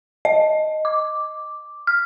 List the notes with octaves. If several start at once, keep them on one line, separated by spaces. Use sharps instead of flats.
D#5
D6
F6